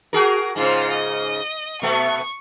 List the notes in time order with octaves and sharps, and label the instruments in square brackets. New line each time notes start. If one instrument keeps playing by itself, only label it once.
[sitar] F#4 G#4 A#4
[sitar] G#2 C#3 [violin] F4 C5
[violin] D#5
[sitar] B2 A3 B3 [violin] C#6